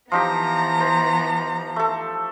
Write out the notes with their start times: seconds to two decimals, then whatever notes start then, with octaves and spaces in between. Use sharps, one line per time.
0.12 E3 F3 B3 D#4 G4 A#5
0.80 C5
1.76 A3 A4